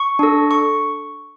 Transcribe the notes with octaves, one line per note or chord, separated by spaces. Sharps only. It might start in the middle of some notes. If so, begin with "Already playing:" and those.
Already playing: C#6
D4 A4
C#6